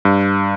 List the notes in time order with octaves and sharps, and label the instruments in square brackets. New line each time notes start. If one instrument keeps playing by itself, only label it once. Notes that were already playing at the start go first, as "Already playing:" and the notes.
[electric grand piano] G2